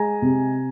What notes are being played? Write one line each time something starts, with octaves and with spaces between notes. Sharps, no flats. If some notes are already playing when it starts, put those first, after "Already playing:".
Already playing: G#3 G#5 A#5
C3